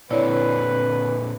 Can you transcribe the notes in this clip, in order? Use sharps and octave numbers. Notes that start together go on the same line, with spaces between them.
A#2 D3 C4 E4 B4 C#5 D5